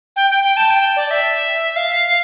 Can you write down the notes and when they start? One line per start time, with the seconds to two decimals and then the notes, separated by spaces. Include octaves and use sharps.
0.16 G5
0.30 G5
0.44 G5
0.57 A5
0.71 G5
0.96 D5
1.11 E5
1.76 F5